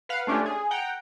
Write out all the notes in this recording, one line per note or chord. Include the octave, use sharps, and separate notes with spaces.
B4 F5 F#5
A3 C#4 D4 F4 G4
G#4
F#5 G5 A#5